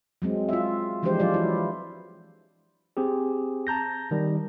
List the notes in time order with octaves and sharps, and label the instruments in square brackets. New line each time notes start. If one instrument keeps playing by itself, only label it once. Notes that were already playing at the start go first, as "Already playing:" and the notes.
[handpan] F#3 G#3 C4
F4 E5
E3 F3 G#3 D4 G4 C5
F#3 F4 D5
E3 E4
[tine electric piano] C4 G4 G#4
A5 A#5 G6 A#6
D#3 G3